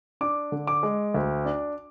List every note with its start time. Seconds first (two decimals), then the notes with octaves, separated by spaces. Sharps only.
0.21 D4 D6
0.52 D3
0.67 D6
0.83 G#3
1.14 D2
1.45 D4